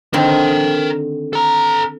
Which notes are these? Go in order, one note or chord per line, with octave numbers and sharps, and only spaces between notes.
D3 D#3 C4 A#4 G5
A4 A#5